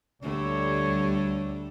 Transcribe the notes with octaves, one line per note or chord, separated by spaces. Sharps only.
D2 D3 G3 A3 C#5